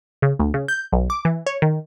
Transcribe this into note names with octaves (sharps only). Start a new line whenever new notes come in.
C#3
D2
C#3
G6
B1
D6
E3
C#5
D#3